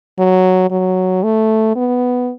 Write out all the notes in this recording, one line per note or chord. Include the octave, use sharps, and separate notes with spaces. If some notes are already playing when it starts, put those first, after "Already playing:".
F#3
F#3
A3
B3